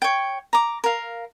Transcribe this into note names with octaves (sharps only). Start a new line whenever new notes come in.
C#5 G5
A#5 D6
A#4 F5